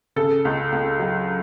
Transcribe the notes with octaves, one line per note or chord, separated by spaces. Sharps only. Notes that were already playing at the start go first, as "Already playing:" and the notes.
C#3 A4
C#2
C#2
F#3